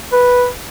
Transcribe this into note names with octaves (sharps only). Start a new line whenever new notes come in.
B4